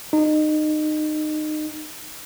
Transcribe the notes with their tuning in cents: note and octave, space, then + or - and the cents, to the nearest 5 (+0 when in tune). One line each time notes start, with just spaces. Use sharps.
D#4 -25